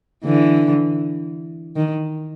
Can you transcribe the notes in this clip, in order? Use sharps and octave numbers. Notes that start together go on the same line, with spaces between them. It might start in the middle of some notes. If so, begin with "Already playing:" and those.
D3 E3
D#3